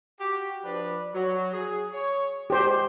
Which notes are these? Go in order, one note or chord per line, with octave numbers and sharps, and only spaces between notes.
F#4 G4
F3 D4 B4
F#3
G#4
C#5
G#3 G4 C5